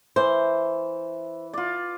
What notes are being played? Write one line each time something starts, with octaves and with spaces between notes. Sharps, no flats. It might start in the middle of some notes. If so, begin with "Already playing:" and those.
E3 C5
F4 D5